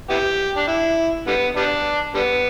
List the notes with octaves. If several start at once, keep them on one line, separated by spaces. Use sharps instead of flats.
B3 E4 G4
D4
E4
D3 G3 B3
G3 B3 D4
D3 G3 B3